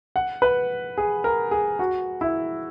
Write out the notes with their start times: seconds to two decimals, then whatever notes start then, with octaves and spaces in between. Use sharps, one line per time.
0.16 F#5
0.42 B4
0.98 G#4
1.24 A#4
1.51 G#4
1.79 F#4
2.21 E4